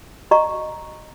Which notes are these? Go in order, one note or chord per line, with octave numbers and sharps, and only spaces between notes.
F#4 D#5 A#5 C#6